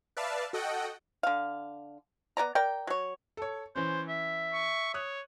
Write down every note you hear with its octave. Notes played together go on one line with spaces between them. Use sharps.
B4 D5 E5 F5 A5
F#4 A4 D#5 F#5 G5
D3 F5
B3 F#4 D5 A#5
A#4 D5 G5
F#3 C#5
A4 C#5
E3 C#4 C5
E5
C#6
C#5 D#6 F#6